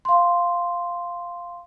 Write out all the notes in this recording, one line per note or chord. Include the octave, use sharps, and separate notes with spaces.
F5 C6